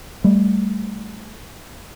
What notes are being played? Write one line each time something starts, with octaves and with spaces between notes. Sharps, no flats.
G3 A3